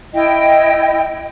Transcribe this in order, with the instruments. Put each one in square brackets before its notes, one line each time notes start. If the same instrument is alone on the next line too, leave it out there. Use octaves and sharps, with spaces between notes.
[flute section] E4 D#5 G5